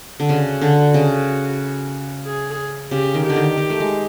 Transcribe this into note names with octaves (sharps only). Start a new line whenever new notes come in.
D3
C#3 F#4
D3
C#3
G#4
C#3 G4
D#3
D3 G4
D#3
D#3
A3
G#3